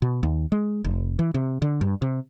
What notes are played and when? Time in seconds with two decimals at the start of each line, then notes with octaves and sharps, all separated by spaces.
0.02 B2
0.23 D#2
0.52 G#3
0.84 F1
1.19 E3
1.34 C3
1.62 D3
1.81 G2
2.02 C3